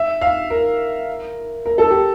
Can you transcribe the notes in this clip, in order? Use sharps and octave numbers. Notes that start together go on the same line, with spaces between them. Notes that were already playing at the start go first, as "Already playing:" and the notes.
Already playing: E5
F5
A#4
A#4
A4
G4